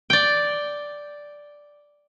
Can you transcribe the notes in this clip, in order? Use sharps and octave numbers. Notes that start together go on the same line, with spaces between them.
D5 G5